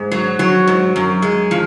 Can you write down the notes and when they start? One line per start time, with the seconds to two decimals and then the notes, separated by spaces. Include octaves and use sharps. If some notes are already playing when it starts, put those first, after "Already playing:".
Already playing: G#2
0.12 F#3
0.39 F#3
0.67 G#2
0.96 F#2
1.22 G#3
1.51 F3